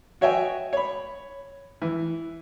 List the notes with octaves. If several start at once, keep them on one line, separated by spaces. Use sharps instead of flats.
F#4 C#5 D#5 E5 G5 G#5
C#5 B5
E3